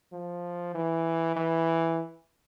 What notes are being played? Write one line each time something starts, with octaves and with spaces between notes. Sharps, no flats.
F3
E3
E3